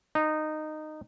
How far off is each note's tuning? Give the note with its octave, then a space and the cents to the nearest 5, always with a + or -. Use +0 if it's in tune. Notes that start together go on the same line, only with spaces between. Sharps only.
D#4 -15